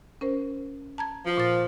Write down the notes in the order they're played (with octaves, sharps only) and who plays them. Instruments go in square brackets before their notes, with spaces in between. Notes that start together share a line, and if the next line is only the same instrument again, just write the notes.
[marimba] C#4 A#4 C5
A5 A#5 G#6
[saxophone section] F3
[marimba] A#2 A6